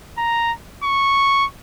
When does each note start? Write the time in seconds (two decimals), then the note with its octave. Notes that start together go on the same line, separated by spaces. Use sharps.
0.18 A#5
0.84 C#6